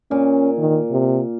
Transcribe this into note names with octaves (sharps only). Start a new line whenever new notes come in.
A#2 C#4
D#3
C3